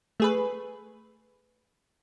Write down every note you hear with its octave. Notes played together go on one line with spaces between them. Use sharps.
A3 G#4 B4